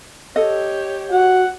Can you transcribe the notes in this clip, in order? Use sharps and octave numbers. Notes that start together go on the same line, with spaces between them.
G4 A4 C#5 D#5
F#4 F#5